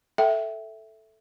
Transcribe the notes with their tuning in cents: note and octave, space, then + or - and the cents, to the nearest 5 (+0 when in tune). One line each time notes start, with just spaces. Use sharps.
A4 +0 E5 +0 G5 -20